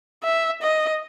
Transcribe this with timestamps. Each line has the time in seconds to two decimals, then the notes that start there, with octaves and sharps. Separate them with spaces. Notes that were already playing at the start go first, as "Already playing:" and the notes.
0.23 E5
0.62 D#5